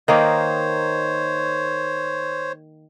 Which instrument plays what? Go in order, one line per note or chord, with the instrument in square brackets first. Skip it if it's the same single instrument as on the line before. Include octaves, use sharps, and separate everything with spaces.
[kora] D#3 A#3 D#4 [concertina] C5 C#5